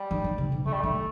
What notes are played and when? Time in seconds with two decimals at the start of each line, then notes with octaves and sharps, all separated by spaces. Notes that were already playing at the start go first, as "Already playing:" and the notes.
Already playing: G3
0.11 E3
0.24 D#3
0.38 C3
0.52 B2
0.66 C3 A3
0.72 G3
0.80 D#3 A3